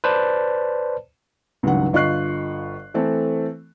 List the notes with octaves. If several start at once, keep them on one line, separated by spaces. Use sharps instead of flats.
B4 C5 D5 A5
C#2 G2 D#3 F#3 F#5
G1 F4 D#5 C#6 F#6 C7
E3 A3 C4 A4